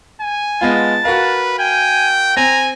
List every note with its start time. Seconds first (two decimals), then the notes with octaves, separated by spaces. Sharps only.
0.21 G#5
0.61 G#3 B3 F4 A5
1.05 F#4 A#4 B4 F5
1.59 G5 G#5
2.37 C4 G#5 A#5